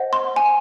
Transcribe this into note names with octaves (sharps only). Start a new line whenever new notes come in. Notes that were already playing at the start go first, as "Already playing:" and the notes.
Already playing: C5 D#5 F#5
C6
G#5